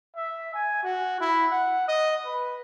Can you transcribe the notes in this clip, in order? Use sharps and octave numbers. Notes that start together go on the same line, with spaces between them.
E5
G#5
F#4
E4
F#5
D#5
B4